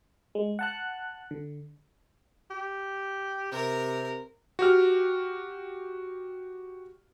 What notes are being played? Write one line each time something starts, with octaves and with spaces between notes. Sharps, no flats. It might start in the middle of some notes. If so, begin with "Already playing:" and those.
G#3
F#5 A5 F#6
D3
G4
C3 A#4
F#4 G4 F6